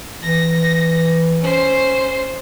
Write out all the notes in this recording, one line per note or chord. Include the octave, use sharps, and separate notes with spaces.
E3 A#6
C#4 C5